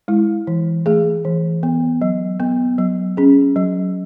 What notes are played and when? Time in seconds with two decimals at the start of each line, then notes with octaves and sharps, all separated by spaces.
0.08 G#3 E4
0.47 E3
0.86 A3 G#4
1.25 E3
1.63 B3
2.02 F#3
2.40 B3
2.78 F#3
3.17 C#4 G#4
3.56 F#3